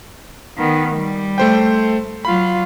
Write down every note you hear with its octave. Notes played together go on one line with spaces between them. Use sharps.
D#3 B3
G3
A3 C5 G5
F#3 F4 B5